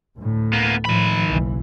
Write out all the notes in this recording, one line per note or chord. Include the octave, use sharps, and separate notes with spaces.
D2 A2
A#3 B3
A2 D#3 F3 B5
F#1 B1 E3